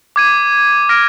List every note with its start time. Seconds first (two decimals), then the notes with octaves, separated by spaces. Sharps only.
0.16 D6 G#6 D#7
0.89 F6 A#6 D7